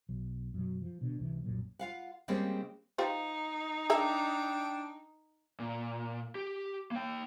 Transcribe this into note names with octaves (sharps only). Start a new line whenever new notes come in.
B1 F#3
F#2 B2 F#3
F3
B2 D3
C#2 C3 E3
C2 F#2 A#2 F#3
F4 F5 F#5
C#3 G3 G#3 A#3 C4 C#4
D#4 F4 G4 C5
D4 A4 A#4 E5 G5
A#2
G4
A#3 G5